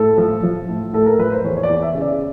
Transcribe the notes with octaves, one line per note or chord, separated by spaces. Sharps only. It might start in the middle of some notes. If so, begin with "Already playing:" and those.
Already playing: A2 A4
F3
F3
A2
A2 A4
A#4
F3 B4
C5
E2 C#5
C#5
D5
E2
E5
C#3
D5